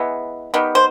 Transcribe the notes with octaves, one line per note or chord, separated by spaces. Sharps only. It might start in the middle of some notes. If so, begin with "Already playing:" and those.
Already playing: E3 G#3 B3
D#3 G3 B3
C5